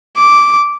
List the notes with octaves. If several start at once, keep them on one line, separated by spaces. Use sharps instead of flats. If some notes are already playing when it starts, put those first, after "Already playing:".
D6